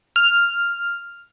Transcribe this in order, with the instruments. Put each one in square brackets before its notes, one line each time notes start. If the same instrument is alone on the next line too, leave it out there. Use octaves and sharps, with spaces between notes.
[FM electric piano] F6